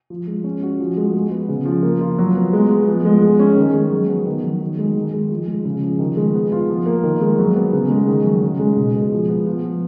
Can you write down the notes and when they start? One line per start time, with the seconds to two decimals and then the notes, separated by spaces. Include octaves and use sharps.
0.10 F3
0.27 G#3
0.44 C#4
0.63 F#4
0.80 F3
0.97 G#3
1.14 G#3
1.31 B3
1.49 C#3
1.66 F3
1.83 A#3
2.01 F4
2.19 F#3
2.36 B3
2.53 G#3
2.70 B3
2.88 F3
3.05 G#3
3.22 G#3
3.39 C#4
3.56 D#3
3.74 G#3
3.91 F#3
4.09 B3
4.26 D#3
4.44 F#3
4.61 D#3
4.78 G#3
4.96 D#3
5.13 G#3
5.31 F3
5.47 G#3
5.65 C#3
5.82 F3
5.99 D#3
6.17 G#3
6.34 B3
6.52 F4
6.69 F3
6.86 A#3
7.04 D#3
7.21 G#3
7.38 F#3
7.56 B3
7.73 C#3
7.90 G#3
8.08 D#3
8.24 F#3
8.42 C#3
8.60 G#3
8.77 B2
8.95 G#3
9.12 F3
9.29 B3
9.47 F3
9.64 B3